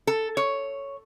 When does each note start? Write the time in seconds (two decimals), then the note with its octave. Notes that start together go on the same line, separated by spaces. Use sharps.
0.07 A4
0.37 C#5